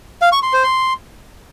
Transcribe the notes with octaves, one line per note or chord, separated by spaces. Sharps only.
F5
C#6
C6
C5
C6